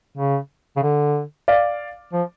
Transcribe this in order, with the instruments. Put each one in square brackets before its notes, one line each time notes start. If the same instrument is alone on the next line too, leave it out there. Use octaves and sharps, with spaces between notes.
[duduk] C#3
C#3
D3
[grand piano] D5 F5
[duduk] F3